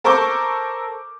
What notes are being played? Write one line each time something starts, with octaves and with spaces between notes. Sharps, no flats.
A4 A#4 C5 C#6 D6 G6